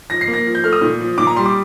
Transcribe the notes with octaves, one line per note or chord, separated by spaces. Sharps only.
F3 A#6
C7
A#3
A#6
F3
G6
A3 F6
D#6
A#2
F3
A#2 D6
A#5
G3 C6
D6